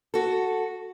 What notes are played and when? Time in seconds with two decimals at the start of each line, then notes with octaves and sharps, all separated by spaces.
0.14 F#4 A4